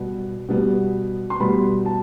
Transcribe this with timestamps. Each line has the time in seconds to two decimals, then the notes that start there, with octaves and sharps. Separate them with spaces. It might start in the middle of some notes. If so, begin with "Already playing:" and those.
Already playing: B2 G3 B3
0.48 B2 G3 B3
1.30 C6
1.40 B2 G3 B3 B5
1.86 A5